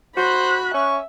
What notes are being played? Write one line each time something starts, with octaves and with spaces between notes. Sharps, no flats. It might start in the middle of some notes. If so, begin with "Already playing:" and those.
F#4 C5 B5 F#6
C#4 E5 C#6